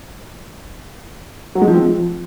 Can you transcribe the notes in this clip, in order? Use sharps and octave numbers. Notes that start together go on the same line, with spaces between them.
F#3
G#3
F3
C4
F3